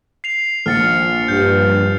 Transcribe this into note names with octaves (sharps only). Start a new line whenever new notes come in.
C7 F7
A#1 F6 A6 C#7
G2 G6